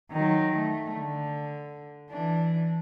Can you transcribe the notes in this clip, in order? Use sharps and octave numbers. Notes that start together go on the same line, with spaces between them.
D#3 F#3
A3
D3
E3 D4